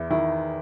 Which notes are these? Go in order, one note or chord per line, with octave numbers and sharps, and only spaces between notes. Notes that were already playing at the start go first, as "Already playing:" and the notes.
Already playing: E2 E4
D#3 E4